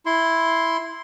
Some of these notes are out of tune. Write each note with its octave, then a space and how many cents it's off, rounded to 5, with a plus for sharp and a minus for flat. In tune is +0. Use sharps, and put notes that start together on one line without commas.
E4 +0 C6 +0